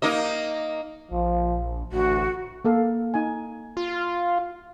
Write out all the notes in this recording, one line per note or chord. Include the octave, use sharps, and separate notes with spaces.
A#3 D#4 D#5
A#1 F3
A1 D2 F#4
A#3 A4 F5
D#4 G#5
F4